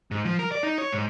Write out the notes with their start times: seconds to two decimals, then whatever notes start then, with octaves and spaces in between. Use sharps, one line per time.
0.11 G#2
0.25 F3
0.39 A#4
0.52 D5
0.63 D#4
0.78 C#5
0.93 G#2